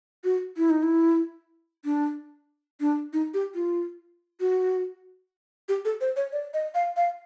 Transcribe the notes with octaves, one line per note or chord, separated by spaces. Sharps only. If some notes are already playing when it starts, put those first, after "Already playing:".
F#4
E4
D#4
E4
D4
D4
D#4
G4
F4
F#4
G4
A4
C5
C#5
D5
D#5
F5
F5